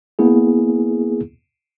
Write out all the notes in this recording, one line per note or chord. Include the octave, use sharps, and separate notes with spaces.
A#3 B3 E4 G#4